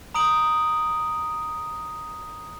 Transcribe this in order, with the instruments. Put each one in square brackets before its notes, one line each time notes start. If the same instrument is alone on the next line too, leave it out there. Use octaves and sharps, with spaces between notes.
[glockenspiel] A#5 D#6 D7 F#7